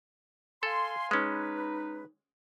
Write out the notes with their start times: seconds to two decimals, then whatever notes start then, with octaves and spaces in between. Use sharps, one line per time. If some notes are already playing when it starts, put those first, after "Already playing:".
0.63 A4 F5 G#5 C6
1.11 G#3 C#4 D#4 B4